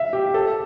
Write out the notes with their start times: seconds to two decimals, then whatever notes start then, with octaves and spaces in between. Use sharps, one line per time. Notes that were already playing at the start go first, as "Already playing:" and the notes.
Already playing: E5 F5
0.13 G4
0.34 A4